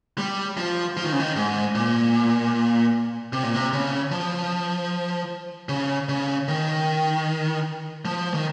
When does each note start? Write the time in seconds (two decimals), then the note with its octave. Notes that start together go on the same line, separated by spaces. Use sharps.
0.18 G3
0.57 F3
0.97 F3
1.04 D#3
1.13 C#3
1.20 D#3
1.36 G#2
1.75 A#2
3.33 C3
3.43 A#2
3.54 C3
3.73 C#3
4.11 F3
5.69 C#3
6.09 C#3
6.48 D#3
8.05 F3
8.34 D#3